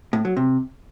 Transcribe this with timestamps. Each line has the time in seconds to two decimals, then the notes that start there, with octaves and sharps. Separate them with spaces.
0.13 A2
0.25 F#3
0.37 C3